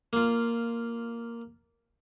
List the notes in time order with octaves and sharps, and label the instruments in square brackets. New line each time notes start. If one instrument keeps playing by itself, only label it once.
[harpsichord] A#3 F4